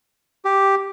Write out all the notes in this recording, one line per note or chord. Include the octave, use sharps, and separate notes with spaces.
G4